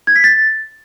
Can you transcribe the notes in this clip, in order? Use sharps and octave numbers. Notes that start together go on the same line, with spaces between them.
G#6
B6
A6